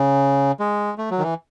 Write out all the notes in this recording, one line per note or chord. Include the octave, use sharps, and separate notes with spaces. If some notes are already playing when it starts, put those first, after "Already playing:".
Already playing: C#3
G#3
A3
F#3
D#3
E3